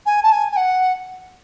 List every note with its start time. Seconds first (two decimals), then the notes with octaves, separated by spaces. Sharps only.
0.06 G#5
0.23 A5
0.32 G#5
0.52 G#5
0.56 F#5